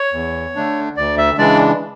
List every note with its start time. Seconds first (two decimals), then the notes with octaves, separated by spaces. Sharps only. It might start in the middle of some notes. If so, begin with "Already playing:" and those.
Already playing: C#5
0.13 E2
0.56 D3 A3 D4
0.97 D2 D5
1.18 E5
1.38 C#3 E3 G#3 D4 D5